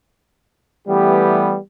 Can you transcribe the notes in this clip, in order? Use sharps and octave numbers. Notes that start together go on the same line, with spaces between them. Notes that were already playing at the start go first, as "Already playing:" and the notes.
E3 G3 A3 B3 G4